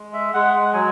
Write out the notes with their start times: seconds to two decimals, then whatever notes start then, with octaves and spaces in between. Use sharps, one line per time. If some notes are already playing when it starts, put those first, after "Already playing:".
Already playing: G#3
0.13 E5
0.34 G#3 F#5
0.53 F#5
0.73 F#3 G#5